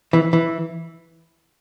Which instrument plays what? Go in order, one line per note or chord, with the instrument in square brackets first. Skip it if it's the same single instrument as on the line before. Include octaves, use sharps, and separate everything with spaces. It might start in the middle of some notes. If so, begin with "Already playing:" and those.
[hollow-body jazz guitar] E3
E3